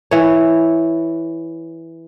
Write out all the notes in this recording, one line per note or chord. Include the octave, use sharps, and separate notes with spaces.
E3 C#5